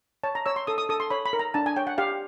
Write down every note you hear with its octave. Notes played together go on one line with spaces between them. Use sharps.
C#5 A5
A#5
C#5 E6
C6
A4 D#6
D#6
A4 D#6
C6
C#5 B5
B5
A#4
A#5
D4 A5
G#5
C#5 G5
F#5
G4 F5